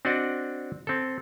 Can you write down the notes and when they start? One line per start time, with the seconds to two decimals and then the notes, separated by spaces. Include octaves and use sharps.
0.05 C4 D4 F#4 D5 D#5 F#5
0.87 C4 A4